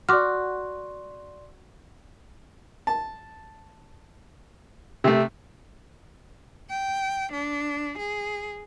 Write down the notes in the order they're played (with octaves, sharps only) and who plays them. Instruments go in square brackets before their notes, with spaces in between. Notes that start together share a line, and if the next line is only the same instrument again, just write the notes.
[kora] F#4 [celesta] D5 C6 [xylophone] D6 F6
[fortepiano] A5
C3 A3
[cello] G5
D4
G#4